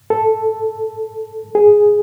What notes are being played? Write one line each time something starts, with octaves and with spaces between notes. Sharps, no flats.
A4
G#4